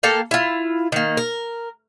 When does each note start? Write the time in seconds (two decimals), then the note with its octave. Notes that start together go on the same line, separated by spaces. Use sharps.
0.03 A#3 A4 F5 G5
0.31 E4 F4
0.92 D#3 A#3
1.17 A#4